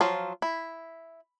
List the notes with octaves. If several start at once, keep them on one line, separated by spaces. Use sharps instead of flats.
F3 F#3 F4
E4